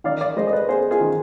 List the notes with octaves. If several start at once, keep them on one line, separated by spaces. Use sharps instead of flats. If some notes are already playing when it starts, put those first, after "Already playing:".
D#3 D5 F5
D5 F5
G#3 C5 D#5
D#5
B4 D5
B3 G#4 C5
F4 G#4
D#3